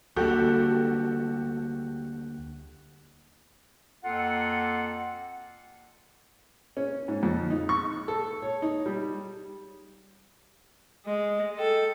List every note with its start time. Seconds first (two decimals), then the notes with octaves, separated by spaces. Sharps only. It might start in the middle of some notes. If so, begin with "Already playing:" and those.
0.16 D2 G3 A#3 F#4 G4 A4
4.04 F2 A#3 C4 F4 A4 F#5
6.77 C#4
7.08 G#2
7.23 F2
7.50 D#4
7.69 C#6
8.08 A4
8.42 C#5
8.62 D#4
8.86 G3
11.06 G#3 D#5
11.59 A4 G5